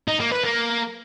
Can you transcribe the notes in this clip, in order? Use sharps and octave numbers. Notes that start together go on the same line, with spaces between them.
D#4
A#3
B4
A#3